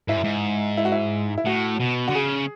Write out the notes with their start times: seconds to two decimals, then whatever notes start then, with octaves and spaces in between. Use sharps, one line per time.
0.08 G#2 E4
0.17 F#2
0.24 G#2
0.78 E4
0.85 F#4
0.92 E4
1.38 E4
1.46 A2 F#4
1.80 B2
2.08 F#4
2.10 D3
2.14 C#3 G#4